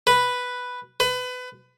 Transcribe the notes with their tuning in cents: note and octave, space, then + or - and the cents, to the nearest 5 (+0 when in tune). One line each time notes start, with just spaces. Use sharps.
B4 +0
B4 +25